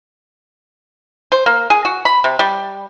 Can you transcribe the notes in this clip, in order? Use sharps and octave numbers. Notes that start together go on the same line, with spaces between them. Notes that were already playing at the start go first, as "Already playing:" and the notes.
C5
A#3
G#4
F#4
B5
C3
G3